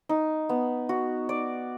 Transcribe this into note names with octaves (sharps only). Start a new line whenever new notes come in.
D#4
B3
F#4
D5